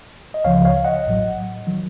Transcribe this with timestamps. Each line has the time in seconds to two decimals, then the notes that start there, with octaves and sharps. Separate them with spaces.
0.34 D#5
0.44 C#2 C#3 F3 C#5 F5
0.65 C#5 F5
0.85 D#5 F#5
1.06 A1 A2 F#3
1.67 D#3 F#3